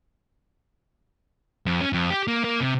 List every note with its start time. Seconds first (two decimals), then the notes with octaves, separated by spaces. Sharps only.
1.66 F2
1.81 C#4
1.93 F2
2.10 G4
2.28 A#3
2.44 A#3
2.61 C3